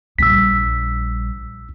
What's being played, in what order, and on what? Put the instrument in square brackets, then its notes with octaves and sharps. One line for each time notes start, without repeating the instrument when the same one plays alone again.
[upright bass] A#1 G3 [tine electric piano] E6 B6